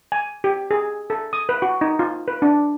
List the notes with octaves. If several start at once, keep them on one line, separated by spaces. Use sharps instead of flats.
G#5
G4
G#4
A4
D#6
B4
F#4
D#4
F4
B4
D4